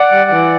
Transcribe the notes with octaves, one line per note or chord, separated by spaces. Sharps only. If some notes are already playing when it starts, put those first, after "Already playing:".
Already playing: D5 F#5
G3
E3